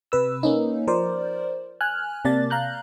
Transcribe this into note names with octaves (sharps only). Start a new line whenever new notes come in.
C3 B4 E6
A#3 C#4 D#4
F3 A#4 C5 D5
G#5 F6 F#6
C3 A#3 D5 A5 A6
F5 A#5 F#6 G6